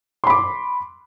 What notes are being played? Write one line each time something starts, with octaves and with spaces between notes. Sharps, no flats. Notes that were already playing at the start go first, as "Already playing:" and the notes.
B5 C6 D6